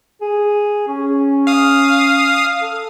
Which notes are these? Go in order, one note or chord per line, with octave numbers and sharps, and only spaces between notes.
G#4
C#4
F5 D#6
A4